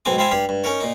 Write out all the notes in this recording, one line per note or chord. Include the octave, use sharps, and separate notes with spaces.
B1 G#2 B2 C4 G#5 D6
C4 E4 C5 F5 G#5 A5
G2 G4 F5
G2
C#4 D#4 A#4 C#5
A#2 D#4